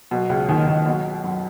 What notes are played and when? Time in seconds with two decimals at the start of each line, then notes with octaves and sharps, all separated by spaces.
0.11 B1 B2
0.30 C#2 C#3
0.49 D#2 D#3
0.67 D#2 D#3
0.86 B1 B2
1.24 F#2